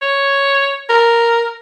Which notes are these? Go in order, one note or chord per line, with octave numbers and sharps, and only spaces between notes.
C#5
A#4